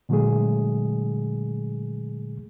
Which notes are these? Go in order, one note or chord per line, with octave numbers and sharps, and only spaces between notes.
A#2 D3 F#3 G#3 A3 G#4